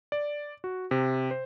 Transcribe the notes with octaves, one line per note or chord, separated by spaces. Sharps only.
D5
F#4
C3
C5